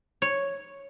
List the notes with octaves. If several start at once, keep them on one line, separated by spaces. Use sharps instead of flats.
C#5